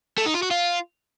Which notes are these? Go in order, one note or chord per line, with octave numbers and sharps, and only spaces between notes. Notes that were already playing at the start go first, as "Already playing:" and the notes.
A3
D#4
F4
F#4
F4